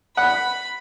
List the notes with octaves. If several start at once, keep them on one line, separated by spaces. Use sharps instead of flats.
F#5 B5